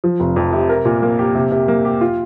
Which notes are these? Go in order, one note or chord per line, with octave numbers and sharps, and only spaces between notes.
F3
F1
F2
C3
A#4
A#2
A#3
G4
C3
C3
A#3
G4
F4